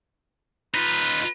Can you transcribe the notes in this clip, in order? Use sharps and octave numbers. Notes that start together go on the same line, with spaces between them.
D#4 F4 B4